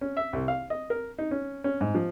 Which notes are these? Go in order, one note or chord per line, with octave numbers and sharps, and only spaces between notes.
C#4
E5
C2
F5
D#5
A#4
D#4
C#4
C#4
G#2
F3